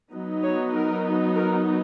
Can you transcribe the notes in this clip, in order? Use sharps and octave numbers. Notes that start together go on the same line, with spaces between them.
F#3 B3 D#4
C#5
A#4
A#4